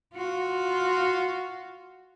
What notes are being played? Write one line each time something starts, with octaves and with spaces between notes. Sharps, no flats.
F4 F#4